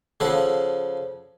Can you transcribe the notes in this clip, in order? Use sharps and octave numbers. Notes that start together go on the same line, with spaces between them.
C#3 F3 A4 F#5